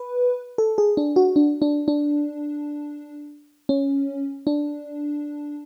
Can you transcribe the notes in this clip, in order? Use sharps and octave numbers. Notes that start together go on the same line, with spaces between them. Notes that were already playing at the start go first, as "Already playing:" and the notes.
Already playing: B4
A4
G#4
D4
F#4
D4
D4
D4
C#4
D4